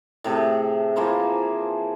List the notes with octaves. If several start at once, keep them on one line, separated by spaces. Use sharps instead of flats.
A2 C3 A3 G#4
E3 F3 A#3 C5